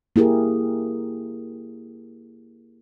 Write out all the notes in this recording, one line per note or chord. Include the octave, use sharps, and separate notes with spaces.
A#3 E4 G4 G#4 A#4